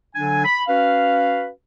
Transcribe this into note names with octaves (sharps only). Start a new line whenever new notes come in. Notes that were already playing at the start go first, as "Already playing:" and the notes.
D3 F#3 D4 G#5
B5
C#4 F#4 B4 F5